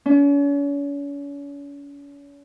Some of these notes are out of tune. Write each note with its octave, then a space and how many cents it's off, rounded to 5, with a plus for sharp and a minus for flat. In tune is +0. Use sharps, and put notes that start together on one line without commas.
C#4 +40